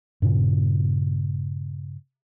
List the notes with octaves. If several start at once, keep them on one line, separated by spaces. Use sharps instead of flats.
G2 A#2 C#3